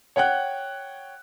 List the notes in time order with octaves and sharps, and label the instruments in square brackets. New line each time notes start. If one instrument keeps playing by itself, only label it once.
[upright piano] C#5 F#5 G5 F#6